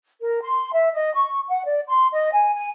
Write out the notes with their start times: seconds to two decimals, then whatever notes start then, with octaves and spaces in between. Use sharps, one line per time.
0.22 A#4
0.42 C6
0.73 E5
0.94 D#5
1.15 C#6
1.49 F#5
1.66 D5
1.89 C6
2.13 D#5
2.33 G#5
2.54 G#5